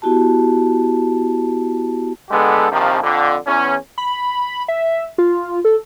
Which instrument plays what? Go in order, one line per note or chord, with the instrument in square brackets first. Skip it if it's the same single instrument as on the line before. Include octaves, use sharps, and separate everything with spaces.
[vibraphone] B3 E4 F#4 G4 A5
[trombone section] D3 G#3 B3 G4 A4
A#1 C3 D#3 F3
F2 D3
E2 C#4
[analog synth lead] B5
E5
F4
A4